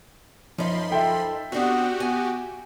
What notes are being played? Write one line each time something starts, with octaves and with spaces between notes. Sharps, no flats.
F#2 F3 D#4 B5 C6
A4 E5 G5
B3 C4 D4 F#4 G4
B3 G#5